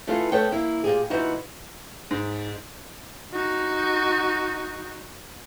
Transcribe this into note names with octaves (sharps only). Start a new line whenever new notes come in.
E3 A3 B3 E4 F4
A3 B3 C#5 G5
A#3 E4
A#2 G4 G#4
A#2 E3 D#4 E4 F#4
G#2
D#4 F#4